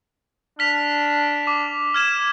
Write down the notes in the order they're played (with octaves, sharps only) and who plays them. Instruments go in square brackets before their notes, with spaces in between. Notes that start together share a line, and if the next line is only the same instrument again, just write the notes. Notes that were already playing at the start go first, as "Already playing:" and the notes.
[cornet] D4 [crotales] F6 B6 F7
[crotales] D6
F6 G#6 E7